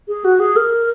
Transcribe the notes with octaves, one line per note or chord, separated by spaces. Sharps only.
G#4
F#4
G#4
A#4